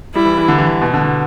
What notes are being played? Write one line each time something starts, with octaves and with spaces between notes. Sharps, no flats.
G3 E4
E3
E3
D3
E3
D3
B2
D3
B2